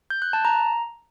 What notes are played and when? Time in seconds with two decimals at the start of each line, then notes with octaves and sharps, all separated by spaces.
0.10 G6
0.22 F#6
0.33 A5
0.45 A#5